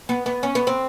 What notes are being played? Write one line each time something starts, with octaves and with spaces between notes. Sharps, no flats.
B3
B3
C#4
B3
C4